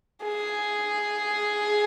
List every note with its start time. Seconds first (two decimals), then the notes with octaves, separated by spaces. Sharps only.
0.24 G#4